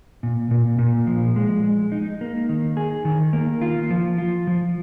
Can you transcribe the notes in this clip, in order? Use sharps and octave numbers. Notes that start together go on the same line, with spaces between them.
A#2
A#2
A#2
F3
G#3
G#3
D#4
A#3
D#3
G#4
D#3
A#3
F4
F3
F4
F3